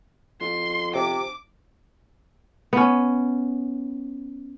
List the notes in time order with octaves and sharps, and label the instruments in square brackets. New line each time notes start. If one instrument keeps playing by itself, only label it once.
[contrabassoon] F2 [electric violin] C6
[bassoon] C3 [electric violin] D6
[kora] B3 C#4